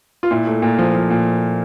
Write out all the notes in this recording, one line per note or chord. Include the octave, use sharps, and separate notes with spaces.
F4
A#2 E4
A3
A#2
F3
F3
A#2